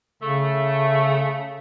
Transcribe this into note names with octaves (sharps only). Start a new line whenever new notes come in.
C#3 A3